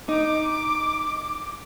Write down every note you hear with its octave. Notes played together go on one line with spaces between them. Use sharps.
D#4 D6